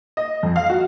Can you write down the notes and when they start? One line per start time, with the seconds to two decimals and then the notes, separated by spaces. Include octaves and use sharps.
0.17 D#5
0.43 F2
0.56 F5
0.70 F#4